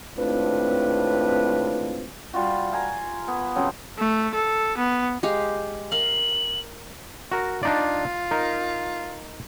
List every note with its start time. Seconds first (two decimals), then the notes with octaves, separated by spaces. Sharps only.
0.17 G#1 A2 C4 D4 F4 B4
2.33 G3 F4 F#4
2.73 F5 G#5 A#5
3.28 B3
3.56 C#3 F3 F#3 C4
3.99 A3
4.35 A4
4.78 B3
5.23 G#3 G4 F5
5.92 A#4 F5 F#7
7.32 F#4 A#4
7.63 D4 D#4 F4 D5
8.31 D#4 A#4